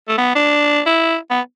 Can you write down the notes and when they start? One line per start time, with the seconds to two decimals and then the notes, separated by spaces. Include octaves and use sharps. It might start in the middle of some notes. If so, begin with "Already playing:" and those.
0.09 A3
0.18 B3
0.35 D4
0.86 E4
1.31 B3